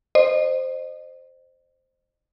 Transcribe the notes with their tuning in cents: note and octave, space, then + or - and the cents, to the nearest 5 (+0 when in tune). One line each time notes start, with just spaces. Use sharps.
C5 +0 D#5 -35